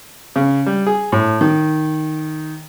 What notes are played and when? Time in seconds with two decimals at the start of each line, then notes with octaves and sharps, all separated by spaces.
0.36 C#3
0.66 G3
0.87 G#4
1.12 A2
1.41 D#3